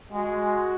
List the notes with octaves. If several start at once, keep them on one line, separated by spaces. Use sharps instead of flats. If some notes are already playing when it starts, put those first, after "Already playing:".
G#3 F#4